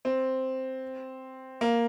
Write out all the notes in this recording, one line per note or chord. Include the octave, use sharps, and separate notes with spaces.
C4
A#3